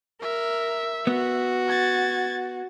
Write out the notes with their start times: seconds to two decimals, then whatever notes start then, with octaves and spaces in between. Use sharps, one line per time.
0.22 A#4 E5
1.07 B3 F#4
1.68 G#6 A6